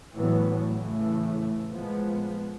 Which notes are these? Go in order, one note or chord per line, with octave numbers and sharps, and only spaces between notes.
A2 E3 F#3 G3 A3 B3
A2 C#3 E3 A3
A#2 F3 G#3 B3